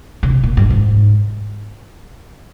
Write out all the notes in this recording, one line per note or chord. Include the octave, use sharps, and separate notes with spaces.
C#3
C3
A#2
G2
G#2